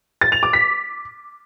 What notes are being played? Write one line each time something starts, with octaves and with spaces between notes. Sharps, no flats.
A6
F7
D6
B6